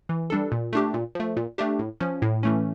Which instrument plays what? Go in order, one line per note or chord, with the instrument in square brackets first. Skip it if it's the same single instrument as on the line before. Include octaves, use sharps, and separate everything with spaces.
[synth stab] E3
G3 D4 A4
A#2
A3 D4 G4
A#2
F3 A3
A#2
A3 D4 G4
A2
F3 C#4
A2
E3 A3 C#4